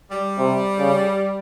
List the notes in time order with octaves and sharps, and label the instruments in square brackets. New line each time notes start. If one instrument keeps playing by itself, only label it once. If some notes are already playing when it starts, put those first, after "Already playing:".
[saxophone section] G3
[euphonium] C3
C#3